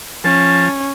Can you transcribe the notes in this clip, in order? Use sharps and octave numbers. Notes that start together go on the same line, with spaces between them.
F3 C#4 A5